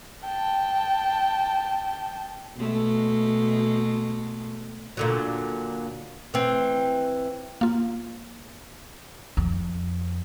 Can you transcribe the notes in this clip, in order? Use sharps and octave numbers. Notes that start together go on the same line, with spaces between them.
G5 A5
B2 G#3 A3
A#2 D3 F#3
E3 C4
A#3 F4
F2